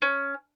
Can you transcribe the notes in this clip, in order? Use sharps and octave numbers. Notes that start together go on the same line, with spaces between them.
C#4